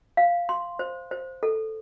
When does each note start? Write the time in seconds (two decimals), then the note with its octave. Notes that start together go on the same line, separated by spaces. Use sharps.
0.17 F5
0.49 C6
0.79 C5
1.11 C5
1.43 A4